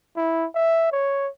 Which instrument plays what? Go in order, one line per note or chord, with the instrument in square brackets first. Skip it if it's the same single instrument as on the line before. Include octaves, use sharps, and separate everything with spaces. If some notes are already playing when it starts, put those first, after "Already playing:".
[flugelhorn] E4
E5
C#5